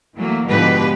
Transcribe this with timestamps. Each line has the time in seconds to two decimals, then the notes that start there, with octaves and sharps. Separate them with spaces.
0.15 E3 F#3 A3 A#3
0.48 G#2 B2 D3 F3 G4 B4